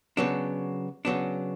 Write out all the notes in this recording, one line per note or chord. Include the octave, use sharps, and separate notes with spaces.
C#3 F#3 B3 D4
C#3 F#3 B3 D4